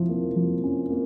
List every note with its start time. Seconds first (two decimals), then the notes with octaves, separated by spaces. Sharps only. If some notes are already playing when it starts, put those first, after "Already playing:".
Already playing: F3 E4
0.09 A#3
0.36 F3
0.64 C#4
0.90 A#3